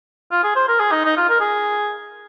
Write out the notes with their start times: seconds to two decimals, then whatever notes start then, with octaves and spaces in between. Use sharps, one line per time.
0.31 F4
0.43 G#4
0.55 C5
0.68 A#4
0.80 G#4
0.91 D#4
1.05 D#4
1.17 F4
1.29 A#4
1.40 G#4